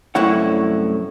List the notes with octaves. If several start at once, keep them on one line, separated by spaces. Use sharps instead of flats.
C2 F#2 A2 E4 C#5 F#5